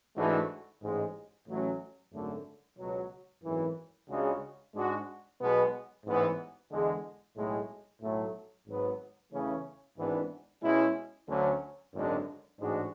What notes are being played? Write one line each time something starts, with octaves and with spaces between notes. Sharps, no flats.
G#2 E3 A3 D4 F#4
A1 G#2 G#3
A1 A2 F#3 C#4
G#1 F#2 D3 A3
C#2 B2 F#3
G#1 F#2 E3
C#2 C#3 G#3 D4 F#4
G#2 G#3 D4 F#4
B1 B2 G#3 B3
A1 G#2 E3 B3
E2 D3 G#3
B1 A2 G#3
B1 A2 F#3 A3
G#1 G#2 F#3 B3
E2 C#3 E3 A3 C#4
G#1 G#2 E3 B3 D4
B2 G#3 C#4 E4
D2 D3 F#3 C#4
G#1 F#2 D3 G#3 D4
A1 G#2 G#3 D4 F#4